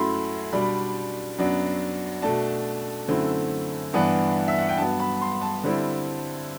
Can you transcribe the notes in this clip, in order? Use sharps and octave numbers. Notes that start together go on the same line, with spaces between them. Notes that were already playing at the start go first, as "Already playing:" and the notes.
Already playing: F#2 F#3 A3 E4 B5 C6
B2 G3 D4 B5
F#2 F#3 B3 D4
B2 A3 D4 A5
F#2 D3 A3 C4 E4
G2 E3 B3 D4
E5
F#5
G5
G2 F#3 B3 A5
B5
C6
A5
D3 G3 C4 E4